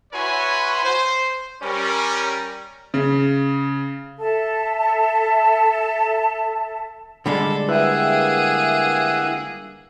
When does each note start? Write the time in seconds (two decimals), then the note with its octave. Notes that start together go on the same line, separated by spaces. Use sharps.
0.13 E4 F#4 B4 C#5 G#5 C6
0.84 C5
1.62 G3 C#4 A#4
2.94 C#3
4.20 A4 E5 A5
7.26 D3 G3 G#3 A4
7.69 A#3 E4 G#4 B4 E5 F#5 G5